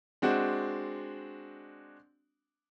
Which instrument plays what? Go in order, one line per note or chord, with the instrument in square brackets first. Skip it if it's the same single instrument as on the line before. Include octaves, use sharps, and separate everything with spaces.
[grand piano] G#3 C4 D4 F#4